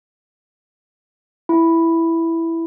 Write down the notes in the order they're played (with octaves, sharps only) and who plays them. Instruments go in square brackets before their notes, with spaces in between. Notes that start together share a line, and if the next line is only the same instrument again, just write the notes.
[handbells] E4